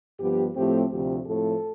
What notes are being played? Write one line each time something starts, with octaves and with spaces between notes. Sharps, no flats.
G2 F3 B3 G4
A2 F3 A3 C4 G4
D2 C3 F3 C4 G4
A2 F3 A3 C4 A4